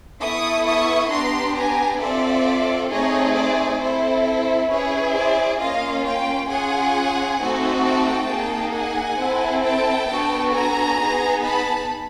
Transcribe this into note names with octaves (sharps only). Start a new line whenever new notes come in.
B3 E4 A4 C#6 D#6
C#6 D#6
B3 D4 G4 A#5 C6
G#5 A#5
C4 F4 A4 D5 E5
A3 C4 D#4 G#4 C#5 D#5
C5 D5
C4 E4 A4 C5
C5
C#4 E4 G#4 B4 C#5
C5 D5
A#3 C#4 F4 D#5 F5
F5 G5
C#4 F4 G#4 F#5 G#5
A3 C4 D#4 F#4 A4
G5 A5
A#3 D#4 G#4
F#5 G#5
C4 E4 A4
G5 A5
B3 D4 F#4 A4
G#5 A#5
B3 D#4 G#4
A5 B5